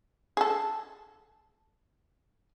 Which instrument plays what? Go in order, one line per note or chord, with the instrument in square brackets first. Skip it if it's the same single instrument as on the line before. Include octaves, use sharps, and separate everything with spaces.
[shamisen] G#4 A4